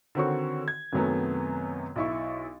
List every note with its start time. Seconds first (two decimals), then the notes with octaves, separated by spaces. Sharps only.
0.15 D3 D#3 C4 F#4 C#5 C#6
0.68 G#6
0.92 F#2 C3 D#3 F#3 A3 B3
1.96 B1 E4 C#6